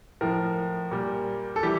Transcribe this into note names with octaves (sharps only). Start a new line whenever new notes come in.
A2 F3 A#4
A#2 G3
A4
E3 G3 G4